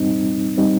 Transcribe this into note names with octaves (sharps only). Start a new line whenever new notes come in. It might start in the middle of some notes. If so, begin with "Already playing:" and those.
Already playing: G3 C4 D#4
G3 C4 D#4